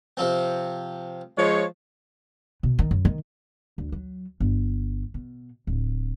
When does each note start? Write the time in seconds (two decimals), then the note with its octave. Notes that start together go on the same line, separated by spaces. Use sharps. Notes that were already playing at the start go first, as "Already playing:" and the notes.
0.17 C3 F3 C4
1.37 F3 G#3 C#5
2.63 B2
2.79 D#3
2.91 F#2
3.05 D#3
3.78 D2
3.92 F#3
4.40 G1
5.14 B2
5.67 D1